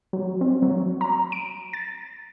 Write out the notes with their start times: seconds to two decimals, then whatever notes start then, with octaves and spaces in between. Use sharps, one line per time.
0.13 F#3
0.41 C4
0.62 F#3
1.01 A#5
1.32 D7
1.73 A6